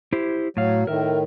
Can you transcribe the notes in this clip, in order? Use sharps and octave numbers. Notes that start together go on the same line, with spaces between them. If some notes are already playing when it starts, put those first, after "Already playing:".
E4 G4 C5
A2 F#3 F5
A2 D#3 A#4 E5